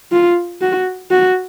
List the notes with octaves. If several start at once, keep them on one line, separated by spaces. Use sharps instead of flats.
F4
F#4
F#4